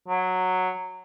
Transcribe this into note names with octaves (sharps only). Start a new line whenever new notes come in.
F#3